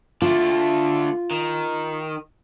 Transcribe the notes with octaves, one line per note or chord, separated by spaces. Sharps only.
D3 A3 F4
D#3